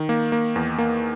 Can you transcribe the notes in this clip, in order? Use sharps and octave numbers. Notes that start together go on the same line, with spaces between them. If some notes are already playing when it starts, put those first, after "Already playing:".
Already playing: D#3
A#3
A#3
E2
A#3